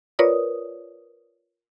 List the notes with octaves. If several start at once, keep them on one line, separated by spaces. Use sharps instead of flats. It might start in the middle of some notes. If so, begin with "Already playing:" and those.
F4 A#4 B4 C#5 D5 D#6